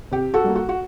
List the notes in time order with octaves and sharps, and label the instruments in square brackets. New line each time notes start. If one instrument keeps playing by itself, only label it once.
[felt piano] C3 G4
F#4 A4
G3 A#3
F#4
F#4